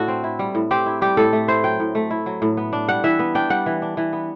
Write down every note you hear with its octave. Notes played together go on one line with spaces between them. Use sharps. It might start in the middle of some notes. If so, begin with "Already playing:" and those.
Already playing: A2 D4 F#4 A4
C4
E4
G3
A2
C4 G4
E4
G3 G4
A2 A4
A3
E4 C5
F#3 G5
A2
A3
E4
F#3
A2
B3
D4
G3 F#5
E3 E5
B3
D4 G5
G3 F#5
E3
D4
E3
B3